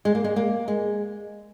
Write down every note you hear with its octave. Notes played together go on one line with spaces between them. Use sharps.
G#3
A#3
G#3
A#3
G#3